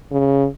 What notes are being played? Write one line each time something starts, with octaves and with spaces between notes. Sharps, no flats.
C#3